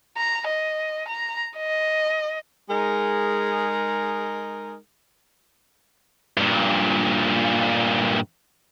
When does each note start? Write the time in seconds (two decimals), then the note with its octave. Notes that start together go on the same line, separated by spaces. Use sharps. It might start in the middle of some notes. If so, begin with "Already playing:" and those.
0.17 A#5
0.48 D#5
1.08 A#5
1.57 D#5
2.69 G#3 D#4 G#4 A#4
6.37 G2 A#2